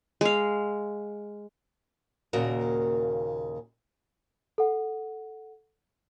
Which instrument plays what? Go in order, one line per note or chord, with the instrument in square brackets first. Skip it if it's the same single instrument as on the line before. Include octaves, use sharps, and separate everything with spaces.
[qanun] G#3 F5
[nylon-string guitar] D#2 A#2 C#3 A#3 F#4 A#4
[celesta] A4 F#5